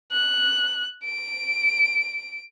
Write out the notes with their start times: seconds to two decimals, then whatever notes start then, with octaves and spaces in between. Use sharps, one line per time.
0.12 F#6
1.05 D7